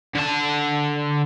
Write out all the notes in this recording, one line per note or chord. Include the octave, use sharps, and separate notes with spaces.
D3 A5